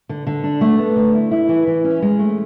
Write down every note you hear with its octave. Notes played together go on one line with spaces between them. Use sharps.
D3
D3
D4
A3
B3
D3
E4
E4
E3
E3
C#4
G#3
A3